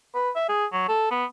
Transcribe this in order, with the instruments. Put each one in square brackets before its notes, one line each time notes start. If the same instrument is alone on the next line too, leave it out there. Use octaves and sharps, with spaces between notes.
[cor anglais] B4
E5
G#4
F#3
A4
B3